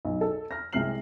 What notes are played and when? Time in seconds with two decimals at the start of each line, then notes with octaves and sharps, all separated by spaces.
0.05 B1
0.21 A4
0.51 F6 A#6
0.73 C2 C3 G#3 F6 C7 F#7